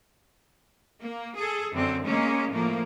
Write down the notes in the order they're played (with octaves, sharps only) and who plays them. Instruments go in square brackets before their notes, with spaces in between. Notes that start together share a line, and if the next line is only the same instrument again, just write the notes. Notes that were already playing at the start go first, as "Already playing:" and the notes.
[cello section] A#3
G#4 A4
F#2 D3 C4
G#3 A#3 C#4
A2 F3 A#3